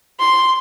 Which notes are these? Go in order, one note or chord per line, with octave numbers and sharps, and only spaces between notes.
C6